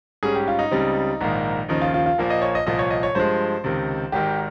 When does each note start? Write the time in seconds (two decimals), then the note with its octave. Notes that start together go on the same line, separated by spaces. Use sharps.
0.23 G#2 G3 C#4 G#4
0.35 G4
0.48 F4
0.59 D#4
0.71 C#2 C#3 G3 C4
1.21 A#1 G#2 D#3 A#3
1.69 D#2 C#3 F3 D#4
1.82 F4
1.94 F4
2.06 F4
2.18 A#1 A#2 F3 A#3
2.30 D#5
2.42 C#5
2.55 D#5
2.67 C2 A#2 F3 D#5
2.79 C#5
2.90 D#5
3.03 C#5
3.15 G2 F3 G#3 C5
3.64 C#2 C3 D#3
4.12 G#1 G#2 D#3 G4